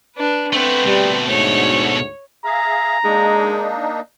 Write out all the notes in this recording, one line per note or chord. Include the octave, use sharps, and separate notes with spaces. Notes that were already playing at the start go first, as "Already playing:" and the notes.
D4 B4
A3 B3 C4 B4
B2 G3 A3
D2 G#2 C#5
G#4 E5 F5 A#5
G#3 A#3 D4 D#4